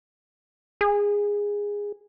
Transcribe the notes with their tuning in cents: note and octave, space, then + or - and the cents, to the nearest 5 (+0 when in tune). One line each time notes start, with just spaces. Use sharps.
G#4 -15